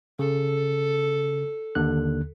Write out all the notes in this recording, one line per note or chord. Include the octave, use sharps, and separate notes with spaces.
C#3 A4
D#2 D3 F#6